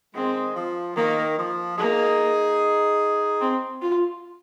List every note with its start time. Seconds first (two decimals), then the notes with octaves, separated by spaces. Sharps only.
0.14 D#3 G#3 C4
0.56 F3
0.96 D#3 A#3
1.38 F3
1.78 A#3 D#4 G#4
3.41 C4
3.82 F4